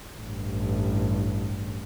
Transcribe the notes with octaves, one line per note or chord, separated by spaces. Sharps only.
A1 G2